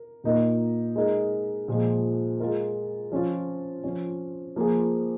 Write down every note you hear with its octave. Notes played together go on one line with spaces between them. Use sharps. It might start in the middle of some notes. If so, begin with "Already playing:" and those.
Already playing: A#4
A#2 A#3 D#4 A#4
G#3 D#4 A#4
A#2 F3 G#3
G#3 F4 A#4
F3 C#4 F4
F3 C#4 F4
F3 A#3 F4 G#4